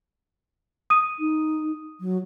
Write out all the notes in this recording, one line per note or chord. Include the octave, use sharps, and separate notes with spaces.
D#6 D#7
D#4
F#3